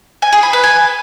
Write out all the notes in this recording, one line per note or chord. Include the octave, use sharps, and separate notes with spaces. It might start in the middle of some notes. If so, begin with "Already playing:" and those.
G#5
G#4
B5
B4
G#5